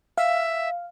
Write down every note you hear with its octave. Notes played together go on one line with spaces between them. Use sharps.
E5 F5